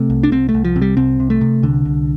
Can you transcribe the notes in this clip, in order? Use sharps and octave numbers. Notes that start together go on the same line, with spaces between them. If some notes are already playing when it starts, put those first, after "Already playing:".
Already playing: C3 A3
C2
D4
C2 C4
A3
C2
F3
C3
G3
C2 C4
C3
A3
C3
C2 D3
C2